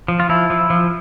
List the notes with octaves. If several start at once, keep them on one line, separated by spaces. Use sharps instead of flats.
F3
F4
F3 E4
F3
F3